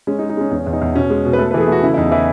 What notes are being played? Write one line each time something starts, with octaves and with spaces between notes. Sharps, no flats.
G#3 C#4
D#4
G#3
D#4
G#3 C#4
E2 C#4
E2
D#4
E2
B2 C#4
G#3
B2
B4
A3 A4
B4
E3 A4
G#4
A3 F#4
C#3 E4
E4
E2 D#4
E3 E4